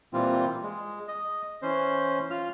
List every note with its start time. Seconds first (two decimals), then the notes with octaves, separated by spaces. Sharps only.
0.13 A#2 E3 G3 C4 F4
0.63 G#3
1.08 D#5
1.62 E3 C#4 C5
2.30 F4 F6